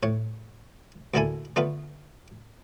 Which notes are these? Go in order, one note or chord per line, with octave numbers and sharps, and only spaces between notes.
A2 C#5
D2 D3 A#3 E4 A4 G#5
D3 A3 B3 F4 B4